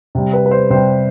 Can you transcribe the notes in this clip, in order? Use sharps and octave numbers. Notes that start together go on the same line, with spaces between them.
C3 G3
B4
B4
C5
C3 G3 C5